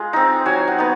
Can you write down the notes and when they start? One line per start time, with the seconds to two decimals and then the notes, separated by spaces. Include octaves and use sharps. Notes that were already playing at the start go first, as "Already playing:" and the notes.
Already playing: G#3 F4
0.13 C4 D#4
0.46 F#3 G#5
0.68 F#5
0.78 B3 D#4